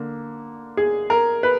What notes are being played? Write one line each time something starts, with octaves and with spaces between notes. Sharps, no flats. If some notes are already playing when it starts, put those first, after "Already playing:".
Already playing: D3 A#3
G#4
A#4
B4